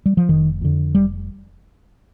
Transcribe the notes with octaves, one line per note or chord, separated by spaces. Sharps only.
G3
F3
F1 D#3
F2 D3
F1 G3